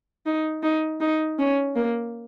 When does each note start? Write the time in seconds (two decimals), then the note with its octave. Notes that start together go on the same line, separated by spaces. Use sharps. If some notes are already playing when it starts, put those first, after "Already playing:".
0.26 D#4
0.63 D#4
1.00 D#4
1.39 C#4
1.76 A#3